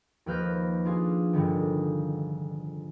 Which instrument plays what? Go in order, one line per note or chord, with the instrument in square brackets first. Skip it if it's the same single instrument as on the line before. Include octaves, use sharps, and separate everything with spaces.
[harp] D#2 F3 B4 F6 G6 A#6
D4 F4 G#4
F1 G2 D3 D#3